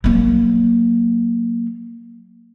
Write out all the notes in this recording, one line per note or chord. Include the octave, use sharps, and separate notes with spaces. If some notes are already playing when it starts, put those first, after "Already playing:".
F#3 A#3